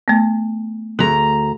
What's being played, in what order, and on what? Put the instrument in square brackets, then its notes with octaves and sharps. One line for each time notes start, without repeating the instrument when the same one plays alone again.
[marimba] A3 B3
[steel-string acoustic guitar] D2 A#5 [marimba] G#4